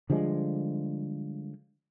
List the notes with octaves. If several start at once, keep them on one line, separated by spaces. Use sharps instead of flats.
D3 F3 G3 G#3